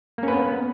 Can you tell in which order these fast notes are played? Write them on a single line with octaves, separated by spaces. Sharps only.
A#3 C#4 B4 B3